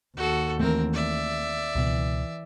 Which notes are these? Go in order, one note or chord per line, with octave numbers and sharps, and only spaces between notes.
D#2 F#4 A4
E3 A3 C4 A#4
D5 E5
C#2 B2 E3